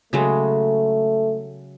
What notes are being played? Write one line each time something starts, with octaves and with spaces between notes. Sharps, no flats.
C#3 F#3 G#3 A3